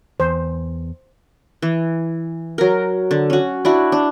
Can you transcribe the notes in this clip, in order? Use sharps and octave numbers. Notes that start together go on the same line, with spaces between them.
E2 C5
E3
F#3 A#4
D3
C#4 F#4
D4 E4 F#4
D4